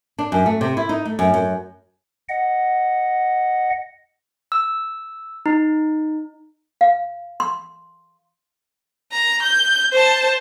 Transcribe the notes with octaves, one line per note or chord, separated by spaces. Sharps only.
D4
F#2
A3
C3
E4
D#4
A3
F#2
F#2
D#5 F#5
E6
D#4
F5
C6
A#5
G6
C5 A5